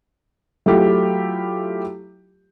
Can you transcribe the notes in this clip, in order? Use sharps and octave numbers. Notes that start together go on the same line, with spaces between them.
F#3 A3 E4 F4 G4